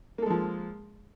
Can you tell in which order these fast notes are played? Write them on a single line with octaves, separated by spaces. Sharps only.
A#3 A4 G#3 F3